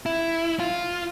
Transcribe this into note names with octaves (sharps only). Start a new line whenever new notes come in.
E4
F4